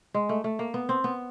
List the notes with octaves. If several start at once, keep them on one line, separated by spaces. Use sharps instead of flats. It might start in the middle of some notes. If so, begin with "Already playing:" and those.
G#3
A3
A3
A#3
B3
C4
B3